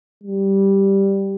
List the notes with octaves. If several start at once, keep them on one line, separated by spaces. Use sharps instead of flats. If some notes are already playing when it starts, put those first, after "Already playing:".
G3